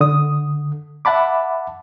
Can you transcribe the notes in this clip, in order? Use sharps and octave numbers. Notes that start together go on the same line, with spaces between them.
D3 D#6
E5 F#5 A5 B5 D6